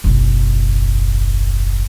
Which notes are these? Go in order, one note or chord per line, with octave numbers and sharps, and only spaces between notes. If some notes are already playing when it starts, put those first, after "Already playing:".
F#1 B1